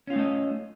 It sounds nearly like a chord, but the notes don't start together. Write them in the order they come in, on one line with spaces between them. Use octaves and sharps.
C#4 F4 D#4 A3 D#5